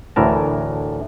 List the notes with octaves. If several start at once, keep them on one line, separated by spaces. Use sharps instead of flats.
D2 A2 E3 A#4 A5